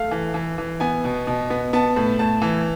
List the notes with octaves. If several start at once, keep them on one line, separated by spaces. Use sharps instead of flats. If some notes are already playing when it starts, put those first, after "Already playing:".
Already playing: A3 F5
E3
E3
E3
B3 G#5
B2
B2
B3
B3 A5
A2
A2 A5
E3